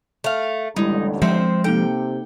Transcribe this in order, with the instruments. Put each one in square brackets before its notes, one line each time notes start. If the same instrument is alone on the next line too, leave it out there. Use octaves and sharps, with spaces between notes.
[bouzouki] A3 F5
[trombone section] A1 D#2 D3 [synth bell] G3 G#3 E4 [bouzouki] D#4
[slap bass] F3 G#3 [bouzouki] C4 C5 E5 [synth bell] C#7
[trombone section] C3 [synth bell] A#3 D#4 A4 [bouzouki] G5